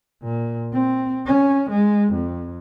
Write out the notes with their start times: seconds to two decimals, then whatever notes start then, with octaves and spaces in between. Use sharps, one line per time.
0.23 A#2
0.73 C4
1.26 C#4
1.70 G#3
2.13 F2